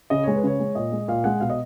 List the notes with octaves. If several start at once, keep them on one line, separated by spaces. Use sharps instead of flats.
C#3 D#5
G#3 C#5
B4
C#3 C#5
G#3
A#2 D#5
G#3
A#2 F5
G#3 F#5
B2 F5
D#5